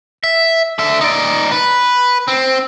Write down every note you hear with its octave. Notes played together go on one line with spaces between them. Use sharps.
E5
D3 E5
D#4 D5
B4
C4